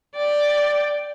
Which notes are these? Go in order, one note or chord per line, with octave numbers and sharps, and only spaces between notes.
D5 G5